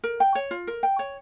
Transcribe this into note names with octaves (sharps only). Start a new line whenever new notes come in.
A#4
G5
C#5
F4
A#4
G5
C#5